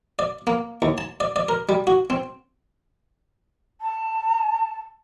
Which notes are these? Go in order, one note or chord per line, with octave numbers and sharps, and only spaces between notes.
D5
A#3
D#2
A5
D5
D5
A#4
G3
F#4
C4
A5